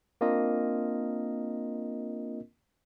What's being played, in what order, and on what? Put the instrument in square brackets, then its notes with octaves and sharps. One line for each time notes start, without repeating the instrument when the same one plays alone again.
[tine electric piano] A#3 C4 D4 F4 A#4 D#5